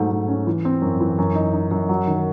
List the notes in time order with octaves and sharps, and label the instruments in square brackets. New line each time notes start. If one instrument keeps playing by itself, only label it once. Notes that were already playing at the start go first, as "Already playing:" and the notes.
Already playing: [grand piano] G#2 F#3 A3
G#2
C#4
E3
C4
F#2
E3
F#2
D#4
D#4
F#2
F#3
D#3